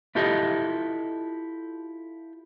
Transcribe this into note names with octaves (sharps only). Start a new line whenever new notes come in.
E4 F4 G4 A4 D#5 E5